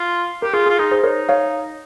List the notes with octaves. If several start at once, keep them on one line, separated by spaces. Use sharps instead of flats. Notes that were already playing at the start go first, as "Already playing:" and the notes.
Already playing: F4
G4 A#4
F4 G#4
F4 G#4
D#4 G#4
G#4 C5
D#4 A#4 C#5
C#5 F5